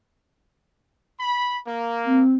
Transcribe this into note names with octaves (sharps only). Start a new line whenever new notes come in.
B5
A#3
C4